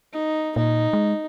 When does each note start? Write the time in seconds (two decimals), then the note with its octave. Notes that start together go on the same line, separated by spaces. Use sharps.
0.13 D#4
0.56 A#2 D#4
0.93 G#3